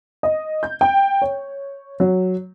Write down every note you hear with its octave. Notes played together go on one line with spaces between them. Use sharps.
D#5
G6
G5
C#5
F#3